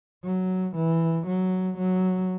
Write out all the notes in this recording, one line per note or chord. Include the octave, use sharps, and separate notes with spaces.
F#3
E3
F#3
F#3